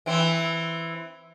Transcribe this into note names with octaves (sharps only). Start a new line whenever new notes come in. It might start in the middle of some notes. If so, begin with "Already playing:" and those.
E3 C4